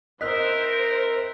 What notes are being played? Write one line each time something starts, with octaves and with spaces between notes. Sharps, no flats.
C4 E4 A#4 C5 D#5 E6 F#6 B6